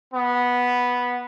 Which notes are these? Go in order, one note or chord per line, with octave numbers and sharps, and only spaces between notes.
B3